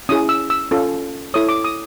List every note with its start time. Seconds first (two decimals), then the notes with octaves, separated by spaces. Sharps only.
0.09 C#4 E4 G#4 D#6
0.29 E6
0.50 E6
0.71 C#4 F4 A4
1.34 E4 A4 C#5 D#6
1.49 D6
1.64 D#6